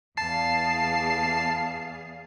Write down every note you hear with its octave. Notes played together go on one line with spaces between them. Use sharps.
E2 G#4 F5 A5 C7